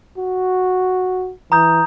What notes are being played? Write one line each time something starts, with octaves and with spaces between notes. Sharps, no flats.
F#4
E3 A#5 D#6 G6